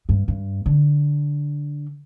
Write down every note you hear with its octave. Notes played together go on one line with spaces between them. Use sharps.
G2
G2
D3